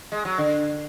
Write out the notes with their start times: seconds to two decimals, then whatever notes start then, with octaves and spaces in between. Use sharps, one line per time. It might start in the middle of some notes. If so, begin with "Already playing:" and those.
0.12 G#3
0.25 F#3
0.38 D3